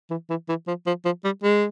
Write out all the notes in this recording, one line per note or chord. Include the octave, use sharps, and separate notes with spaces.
E3
E3
E3
F3
F3
F3
G3
G#3